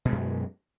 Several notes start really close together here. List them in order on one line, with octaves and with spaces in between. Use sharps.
B2 G#3 F#2